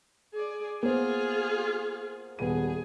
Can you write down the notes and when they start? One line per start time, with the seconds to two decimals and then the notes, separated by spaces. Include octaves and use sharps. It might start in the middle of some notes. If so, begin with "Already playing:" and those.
0.34 G#4 D5
0.83 A#3 B3 F4 G#4 C5
2.39 D#1 B3 G#4 D#7